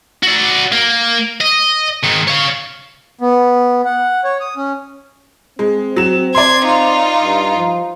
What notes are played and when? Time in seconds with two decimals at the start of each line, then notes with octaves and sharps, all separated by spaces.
0.23 F#4 D5
0.72 A#3
1.41 D#5
2.03 G#2 D#3
2.27 C#5 F5
3.21 B3
3.85 F#5
4.24 C#5
4.40 D#6
4.57 C#4
5.59 G#3 C4
5.96 F#3 E7
6.35 D5 C6 G#6 C7
6.66 D#4 F4
7.23 G2
7.57 F3